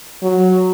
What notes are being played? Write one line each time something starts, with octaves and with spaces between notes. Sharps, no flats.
F#3